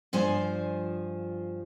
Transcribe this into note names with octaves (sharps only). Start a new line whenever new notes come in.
G2 F3 C5 G#5